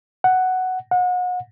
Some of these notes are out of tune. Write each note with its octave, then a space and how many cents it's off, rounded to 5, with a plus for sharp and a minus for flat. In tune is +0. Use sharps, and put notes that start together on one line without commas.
F#5 +5
F#5 -35